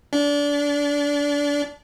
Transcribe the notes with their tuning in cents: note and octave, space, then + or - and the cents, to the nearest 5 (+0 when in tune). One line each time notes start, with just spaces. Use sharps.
D4 -25